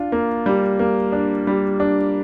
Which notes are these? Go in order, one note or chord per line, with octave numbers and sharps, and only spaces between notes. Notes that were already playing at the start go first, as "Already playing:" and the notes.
Already playing: D4 F4
A#3
G3
A#3
D4
G3
D4